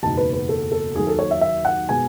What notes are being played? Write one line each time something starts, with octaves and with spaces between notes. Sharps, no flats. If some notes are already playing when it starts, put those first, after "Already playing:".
F#1 E2 B2 G#3 D#4 A5
B4
B4
A4
A4
D#2 D#3 F#3 G#4
A4
C#5
E5
E5
F#5
B2 G#3 B3 G#5